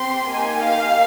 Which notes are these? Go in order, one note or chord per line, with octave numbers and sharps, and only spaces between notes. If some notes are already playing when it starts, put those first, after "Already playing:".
Already playing: C4 G4 C6
A#3 D#4 G4 G#5
F5